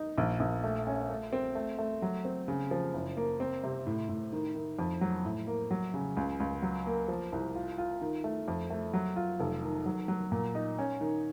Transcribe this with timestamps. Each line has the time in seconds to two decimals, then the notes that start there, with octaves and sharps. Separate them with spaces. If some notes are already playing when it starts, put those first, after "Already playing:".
Already playing: D#4
0.18 A#1
0.40 A#1
0.64 A3
0.87 C#4
1.09 A3
1.33 C4
1.55 A3
1.78 A3
2.02 F#3
2.25 C4
2.48 C#3
2.71 F3
2.94 F#1
3.17 A#3
3.40 C4
3.63 C3
3.87 A2
4.09 A2
4.33 D#3
4.55 D#3
4.79 F2
5.01 F#3
5.25 A2
5.47 A#3
5.71 F#3
5.94 C#3
6.17 C#2
6.40 C#2
6.62 F#3
6.87 A#3
7.08 F3
7.32 C2
7.55 F4
7.78 F4
8.01 D#3
8.24 A3
8.48 F2
8.70 A3
8.94 F#3
9.16 F4
9.40 F1
9.62 D#3
9.86 F#3
10.08 F#3
10.32 A#2
10.55 D#4
10.79 C#4
11.01 D#3